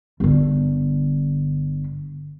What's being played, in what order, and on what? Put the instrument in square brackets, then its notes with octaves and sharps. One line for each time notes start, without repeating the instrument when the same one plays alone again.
[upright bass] G1 D3